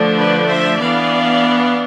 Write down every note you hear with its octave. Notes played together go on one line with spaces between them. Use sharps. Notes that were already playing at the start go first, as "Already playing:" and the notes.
Already playing: D3 F3 A3 D4
B4 D5
C5 E5
E3 B3 D4 D5 F5